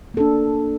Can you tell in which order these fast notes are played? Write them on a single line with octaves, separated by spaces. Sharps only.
A#3 A4 D4